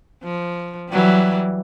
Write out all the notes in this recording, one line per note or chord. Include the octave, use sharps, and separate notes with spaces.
F3
E3 F#3 G3